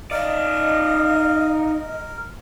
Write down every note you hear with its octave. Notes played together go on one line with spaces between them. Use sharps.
D#4 A#4 D5 D#5 F5